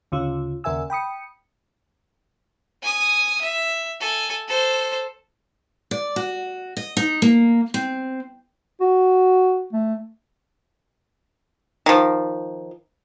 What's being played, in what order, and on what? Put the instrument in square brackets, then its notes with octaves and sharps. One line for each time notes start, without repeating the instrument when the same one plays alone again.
[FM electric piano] D2 C#3 F4
D#2 C#3 A#4 E5 G#5 E6
G5 B5 D#6 C#7
[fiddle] G#5 D#6
E5
A4 G#5
A4 C5
[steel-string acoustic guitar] D5
F#4
D#5
D#4
A#3
C4
[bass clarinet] F#4
A3
[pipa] D#3 F3